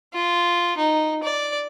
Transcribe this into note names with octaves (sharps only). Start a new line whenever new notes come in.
F4
D#4
D5